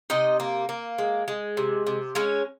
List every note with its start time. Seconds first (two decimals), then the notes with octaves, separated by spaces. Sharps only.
0.10 C3 D#4 D#5
0.40 A#3
0.69 A#3
0.98 G#3
1.28 G#3
1.57 C3
1.87 C3
2.15 G#3 C#4 C#5